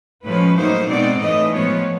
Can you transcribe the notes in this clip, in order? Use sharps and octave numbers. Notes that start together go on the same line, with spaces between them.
A2 F3 G#3 C#4 B4
A2 F#3 A#3 D#4 C5
B2 G#3 C4 D#4 D5
A2 E3 A3 D#5
A2 F3 G#3 B3 C#5